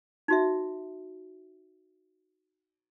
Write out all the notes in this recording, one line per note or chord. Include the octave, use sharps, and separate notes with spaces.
D#4 F#4 E5